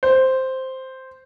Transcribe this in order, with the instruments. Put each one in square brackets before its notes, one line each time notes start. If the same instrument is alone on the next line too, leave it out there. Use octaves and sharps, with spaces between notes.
[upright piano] C5